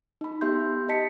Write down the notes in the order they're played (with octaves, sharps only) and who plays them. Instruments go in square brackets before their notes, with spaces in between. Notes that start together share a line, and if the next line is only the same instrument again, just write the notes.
[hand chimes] D#4 B5
B3 G4 E5 C6 G6
G4 D#5 A5 B6 C#7